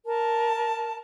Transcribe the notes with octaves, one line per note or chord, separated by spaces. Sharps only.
A#4 A5